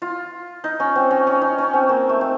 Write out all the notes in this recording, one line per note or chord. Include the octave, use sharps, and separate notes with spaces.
F4
D#4
C#4
C4
C#4
C#4
D#4
C#4
C4
A#3
A3
C4